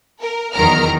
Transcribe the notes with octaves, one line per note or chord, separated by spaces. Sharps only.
A#4
E2 D#3 F#3 A#4 A#5 F6